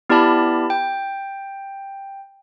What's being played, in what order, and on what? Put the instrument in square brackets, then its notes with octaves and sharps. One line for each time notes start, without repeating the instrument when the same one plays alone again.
[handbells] B3 E4 G4 D5 A5 B5
G5